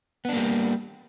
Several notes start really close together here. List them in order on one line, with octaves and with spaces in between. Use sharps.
B3 D4 A#3 G3